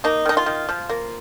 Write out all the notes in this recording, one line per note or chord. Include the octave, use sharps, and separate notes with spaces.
A#3 D#4
D#3 D#4
F4
D#3
F3
A#3